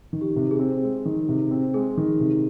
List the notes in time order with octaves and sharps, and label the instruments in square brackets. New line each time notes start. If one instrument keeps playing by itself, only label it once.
[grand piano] D#3
[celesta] G4
[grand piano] C3
[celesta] G#4
[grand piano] C4
G#3
D#3
C3
C4
[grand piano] G#3 [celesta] G#4
[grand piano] D#3
C3